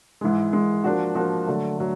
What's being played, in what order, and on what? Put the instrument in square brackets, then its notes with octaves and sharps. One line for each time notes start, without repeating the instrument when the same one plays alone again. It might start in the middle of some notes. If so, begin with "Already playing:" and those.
[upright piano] G#2 E3 G#3
G#2 E3 G#3
F3 A#3 D4 F#4
F3 A#3 D4 F#4
D3 F#3 A3
F#3 A3